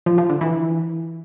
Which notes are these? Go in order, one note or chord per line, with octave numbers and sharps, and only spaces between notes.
F3
F3
D3
E3